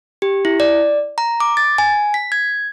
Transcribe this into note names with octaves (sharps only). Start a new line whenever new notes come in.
G4
E4
D5
A#5
D6
A6
G#5
B6
G#6